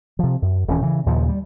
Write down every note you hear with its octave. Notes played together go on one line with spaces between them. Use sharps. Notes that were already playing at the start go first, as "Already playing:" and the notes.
C3 F3
F#2
D#1 D2 E3 C#4
C#3 E3
D#2 A#2 C#3 F3
G3